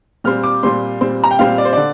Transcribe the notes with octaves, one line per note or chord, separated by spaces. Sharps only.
A#2 G3 C4 F6
D6
A#2 G3 C4 C6
A#2 G3 C4
A#5
G5
A#2 G3 C4 F5
D5
C5
D3 D5